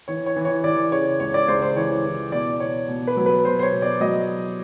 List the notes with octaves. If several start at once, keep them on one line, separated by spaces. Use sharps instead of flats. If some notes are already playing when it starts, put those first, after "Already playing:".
E3 C#5
C#5
E3
C#5
E3 D5
C#3 C#5
C#2 C#5
D5
C#2 C5
C5
E3 C#5
E3
B2 D5
B2 C#5
B2
B4
F#3
B4
B2 C5
C5
C#5
B2
D5
F#3 D#5